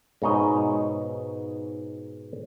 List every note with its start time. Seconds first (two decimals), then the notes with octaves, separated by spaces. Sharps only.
0.22 G#2 B2 D#4 C#5 D#5